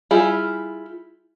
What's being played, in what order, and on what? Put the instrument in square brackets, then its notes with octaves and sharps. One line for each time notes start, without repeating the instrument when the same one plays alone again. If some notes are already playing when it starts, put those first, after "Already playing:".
[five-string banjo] G3 E4 F4 G#4